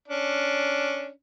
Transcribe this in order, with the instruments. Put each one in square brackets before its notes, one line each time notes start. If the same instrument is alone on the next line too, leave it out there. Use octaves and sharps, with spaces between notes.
[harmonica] C#4 D4